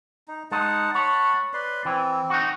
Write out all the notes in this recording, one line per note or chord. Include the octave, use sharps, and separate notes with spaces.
D#4
G#3 D#4 F#5 A5
C#5 F#5 A5 B5
B4 D5 C6
E3 C4
D#4 F#4